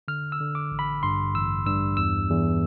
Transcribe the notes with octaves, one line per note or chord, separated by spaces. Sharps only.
D3 F6
E6
D3
D6
A1
B5
G2 C6
A1 E6
G2 E6
E2 E6
E2